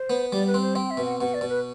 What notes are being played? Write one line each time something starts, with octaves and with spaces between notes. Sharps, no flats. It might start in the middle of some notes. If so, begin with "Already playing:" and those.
Already playing: C5
B3
G3 D5
B4
C4
C5
C4 G5
E5
B2
F#5
B2 F#5
D5
B2
B4